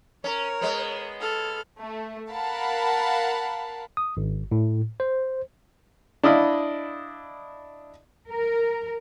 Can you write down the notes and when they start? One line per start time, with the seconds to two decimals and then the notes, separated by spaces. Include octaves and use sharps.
0.24 C#4 A#4 C#5
0.62 G#3 B3
1.21 A4 F6
1.79 A3
2.32 A#4 F5 F#5 A5 B5
3.97 D#6
4.17 G#1
4.52 A2
5.00 C5
6.23 D4 E4 D#5 F5 B5
8.30 A#4